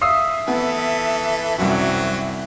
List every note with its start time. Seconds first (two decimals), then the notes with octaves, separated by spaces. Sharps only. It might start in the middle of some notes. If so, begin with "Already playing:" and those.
0.01 E5 F5 D#6 E6 C7
0.48 E3 B3 A4
1.58 C2 F#2 F#3 C4 F#5